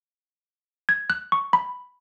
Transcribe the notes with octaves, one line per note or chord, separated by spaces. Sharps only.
G#6
F#6
C#6
B5